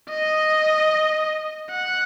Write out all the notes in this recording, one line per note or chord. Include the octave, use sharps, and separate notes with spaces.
D#5
F#5